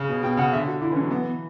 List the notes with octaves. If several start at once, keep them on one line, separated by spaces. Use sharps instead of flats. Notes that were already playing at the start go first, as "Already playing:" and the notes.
Already playing: C#3
B2
B2 G5
C#3 F#5
D3 E5
F#4
D3 E4
E3 C#4
F#3
E3 B3